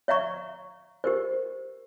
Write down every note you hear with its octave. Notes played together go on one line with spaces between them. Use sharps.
C#5 E5 F5 A#5 C#6
G4 A#4 C5